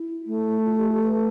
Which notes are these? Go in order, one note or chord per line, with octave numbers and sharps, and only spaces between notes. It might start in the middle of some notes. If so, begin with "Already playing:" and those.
Already playing: E4
A3
F4
G4
G4
B4